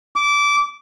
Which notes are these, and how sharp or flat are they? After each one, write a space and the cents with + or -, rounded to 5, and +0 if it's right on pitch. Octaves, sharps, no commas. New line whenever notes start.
D6 -20